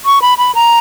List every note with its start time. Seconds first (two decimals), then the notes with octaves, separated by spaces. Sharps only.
0.05 C#6
0.22 B5
0.38 B5
0.55 A#5